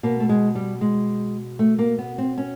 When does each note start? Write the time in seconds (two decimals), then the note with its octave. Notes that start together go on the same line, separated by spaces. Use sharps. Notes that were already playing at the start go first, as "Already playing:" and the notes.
0.03 B2 A#3
0.20 A3
0.29 G#3
0.55 G3
0.81 G#3
1.59 A3
1.79 A#3
1.98 B3
2.18 C4
2.38 C#4